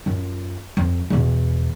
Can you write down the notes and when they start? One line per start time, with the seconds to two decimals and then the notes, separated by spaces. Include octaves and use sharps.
0.06 F#2 F4
0.77 F2
1.10 E2 B2